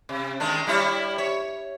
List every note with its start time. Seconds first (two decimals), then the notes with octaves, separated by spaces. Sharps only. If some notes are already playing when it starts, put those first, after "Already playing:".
0.09 C3
0.40 D#3 G#3 D4
0.67 G3 E4 C#5
1.18 C#5